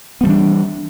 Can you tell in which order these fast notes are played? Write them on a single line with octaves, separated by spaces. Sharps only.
B3 G3 E3 D4